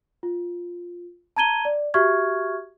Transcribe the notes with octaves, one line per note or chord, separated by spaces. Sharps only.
F4
A5 A#5 G#6 D#7 G7
D5
F#4 G4 E5 C#6 F6 G#6